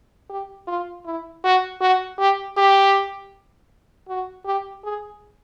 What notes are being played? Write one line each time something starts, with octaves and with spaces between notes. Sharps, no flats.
G4
F4
E4
F#4
F#4
G4
G4
F#4
G4
G#4